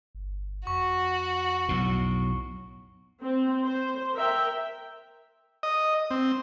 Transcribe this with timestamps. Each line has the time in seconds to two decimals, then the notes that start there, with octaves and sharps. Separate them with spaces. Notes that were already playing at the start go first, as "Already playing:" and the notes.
0.15 G1
0.67 F2 F#4 C#6
1.69 B1 A2
3.23 C4
3.64 C5
4.13 A#4 E5 G5
5.63 D#5
6.11 C4